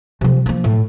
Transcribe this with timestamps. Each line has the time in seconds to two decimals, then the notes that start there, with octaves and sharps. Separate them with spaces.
0.21 C3 F3
0.46 F3 A#3
0.64 A2